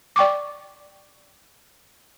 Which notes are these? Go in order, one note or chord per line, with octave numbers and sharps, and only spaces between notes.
D5 G5 C#6 D6